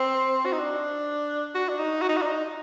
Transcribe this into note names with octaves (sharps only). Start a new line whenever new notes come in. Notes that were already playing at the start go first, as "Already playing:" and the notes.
Already playing: C4
F#4
D#4
D4
F#4
D4
D#4
F#4
D#4
F#4
D4
D#4